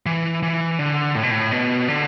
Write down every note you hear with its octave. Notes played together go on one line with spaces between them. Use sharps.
E3
E3
D3
A2
B2
A2
B2
D3